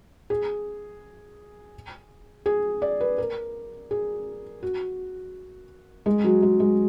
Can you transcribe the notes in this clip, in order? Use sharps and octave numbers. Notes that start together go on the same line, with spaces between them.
G#4
G#4
D5
B4
A#4
G#4
F#4
G#3
F#3
G#3
G#3